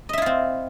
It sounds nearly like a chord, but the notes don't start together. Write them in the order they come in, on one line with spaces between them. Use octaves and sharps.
D#5 E5 E4 F4 C4